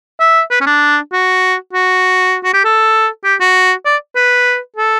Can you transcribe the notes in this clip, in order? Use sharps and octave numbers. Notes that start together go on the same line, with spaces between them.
E5
B4
C#4
D4
F#4
F#4
F#4
G4
A4
G4
F#4
D5
B4
A4